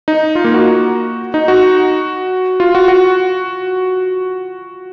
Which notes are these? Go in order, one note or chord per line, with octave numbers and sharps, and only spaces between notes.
D#4
F4
A#3
F#4
D#4
F#4
F4
F#4
F#4